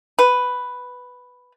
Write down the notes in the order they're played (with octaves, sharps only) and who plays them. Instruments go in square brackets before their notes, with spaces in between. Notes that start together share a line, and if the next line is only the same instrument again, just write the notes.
[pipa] B4